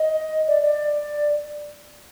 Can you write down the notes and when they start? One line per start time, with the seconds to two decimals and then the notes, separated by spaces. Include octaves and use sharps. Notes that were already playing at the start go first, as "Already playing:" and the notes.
Already playing: D#5
0.48 D5
0.62 D5